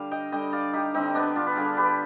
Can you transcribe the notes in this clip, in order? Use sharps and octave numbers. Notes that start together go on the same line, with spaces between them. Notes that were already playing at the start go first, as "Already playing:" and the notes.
Already playing: D3 G3 F5
D#5 G5
D3 G3 D#5 G5
D5 F5
D#4 G4
D3 G3 C4 D#4
B3 D4
D4 F4
B4
D3 G3 F4 G#4
G4 B4